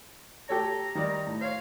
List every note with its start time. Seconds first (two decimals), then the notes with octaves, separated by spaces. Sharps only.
0.49 G4 A4 C#5 A#5
0.95 D#3 G3 D5
1.27 A2
1.41 C5 C#5 F5